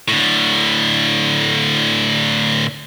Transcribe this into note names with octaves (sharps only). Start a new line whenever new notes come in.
A2 D3